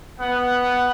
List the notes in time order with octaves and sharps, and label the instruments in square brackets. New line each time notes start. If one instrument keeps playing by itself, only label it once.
[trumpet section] B3 F#5